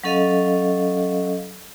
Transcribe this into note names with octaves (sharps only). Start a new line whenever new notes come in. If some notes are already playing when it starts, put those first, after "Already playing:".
F#3 C#4 A4 D#5 F5